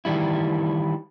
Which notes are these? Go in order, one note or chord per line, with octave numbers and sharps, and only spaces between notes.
D#3 E3 G3 E4